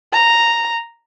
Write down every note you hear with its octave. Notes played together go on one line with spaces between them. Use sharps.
A#5